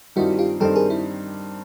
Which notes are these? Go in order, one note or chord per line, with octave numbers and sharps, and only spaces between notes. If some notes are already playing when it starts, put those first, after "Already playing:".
G2 D#3 G3 C4 D#4 E4 F#4
F4 G4
G2 D#3 G3 C4 D#4 G4 A4
G#4 A#4
E4